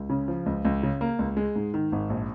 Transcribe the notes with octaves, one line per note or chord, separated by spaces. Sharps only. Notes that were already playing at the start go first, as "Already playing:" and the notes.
Already playing: C#2
C#3
F3
C#2
C#2
C#3
A#3
C#2
G#3
G#2
D#3
G#1
A#1